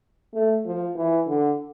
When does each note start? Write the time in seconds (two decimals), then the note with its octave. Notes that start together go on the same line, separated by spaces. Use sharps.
0.34 A3
0.66 F3
0.96 E3
1.27 D3